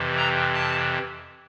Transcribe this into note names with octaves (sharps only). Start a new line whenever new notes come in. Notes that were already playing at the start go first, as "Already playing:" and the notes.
Already playing: F2 C3 E3
A#5
A5